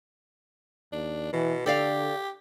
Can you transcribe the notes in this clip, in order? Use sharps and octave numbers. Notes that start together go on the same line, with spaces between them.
D#2 D4
B2 E3
D3 G4 A4 D5 F5